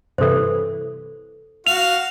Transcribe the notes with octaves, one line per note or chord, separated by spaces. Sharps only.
G2 C3 E3 A4 C5
F#4 F5 F7